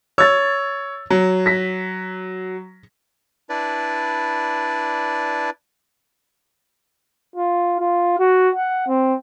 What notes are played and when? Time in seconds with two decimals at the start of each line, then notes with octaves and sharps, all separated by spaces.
0.18 C#5 E6 A6
1.10 F#3
1.46 A#6 B6
3.50 D4 E4 B4 D5
7.36 F4
7.80 F4
8.19 F#4
8.55 F#5
8.88 C4